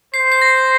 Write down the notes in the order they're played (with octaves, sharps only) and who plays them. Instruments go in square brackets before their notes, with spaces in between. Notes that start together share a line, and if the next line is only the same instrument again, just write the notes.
[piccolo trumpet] C5 [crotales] C7
[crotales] C7
A#6